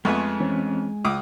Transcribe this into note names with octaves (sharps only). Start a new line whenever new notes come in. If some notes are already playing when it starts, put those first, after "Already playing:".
F2 G#3 A3 B3 G#5 C6 C#6 D#6
E3 C4 C#4
C#2 F4 D6 D#6